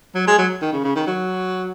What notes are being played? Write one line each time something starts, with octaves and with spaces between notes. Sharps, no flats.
F#3
G#3
F#3
D#3
C#3
C#3
D#3
F#3